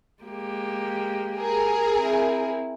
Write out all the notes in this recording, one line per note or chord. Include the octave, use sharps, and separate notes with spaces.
G#3 A#3 G4
G#4 A#4
C4 E4